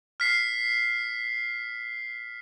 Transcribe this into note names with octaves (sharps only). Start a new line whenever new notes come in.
F6 B6 C7